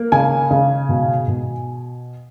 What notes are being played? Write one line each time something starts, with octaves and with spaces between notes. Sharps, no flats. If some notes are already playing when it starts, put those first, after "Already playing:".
Already playing: A#3
C#3 G#5
C#3
B2
B2